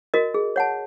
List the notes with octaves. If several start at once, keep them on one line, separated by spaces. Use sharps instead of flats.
F#4 A#4 D#5
G#4
C#5 F#5 A5